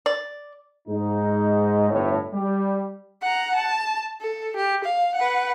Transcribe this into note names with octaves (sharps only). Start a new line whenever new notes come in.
D5
G#2 D#4
G1 A2 A3 C#5
G3
F#5 A#5
A5
A4
G4
F5
B4 F#5